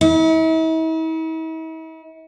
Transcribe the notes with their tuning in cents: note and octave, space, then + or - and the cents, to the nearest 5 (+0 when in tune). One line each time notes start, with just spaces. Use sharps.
E4 -45